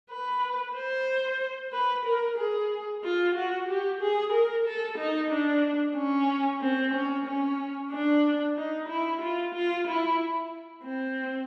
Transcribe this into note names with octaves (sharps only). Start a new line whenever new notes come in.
B4
C5
B4
A#4
G#4
F4
F#4
G4
G#4
A#4
A4
D#4
D4
C#4
C4
C#4
C#4
D4
D#4
E4
F4
F4
E4
C4